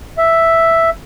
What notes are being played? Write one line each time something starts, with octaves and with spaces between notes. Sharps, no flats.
E5